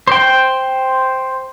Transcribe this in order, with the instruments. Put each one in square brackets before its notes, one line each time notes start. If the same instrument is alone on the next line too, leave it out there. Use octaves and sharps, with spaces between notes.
[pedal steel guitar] C5 G5